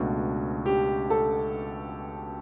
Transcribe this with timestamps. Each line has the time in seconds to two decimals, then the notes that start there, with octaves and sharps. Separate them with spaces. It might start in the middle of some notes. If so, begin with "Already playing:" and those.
Already playing: C#2 B2 A3 D4 F#4
0.66 G4
1.10 A4